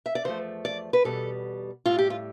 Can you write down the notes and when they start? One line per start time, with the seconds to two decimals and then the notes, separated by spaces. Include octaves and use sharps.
0.06 E5
0.15 D5
0.24 E2 D3 F3 A3 C5
0.65 D5
0.93 B4
1.04 E2 B2 G3 A4
1.86 A2 G3 F4
1.99 G4
2.10 F4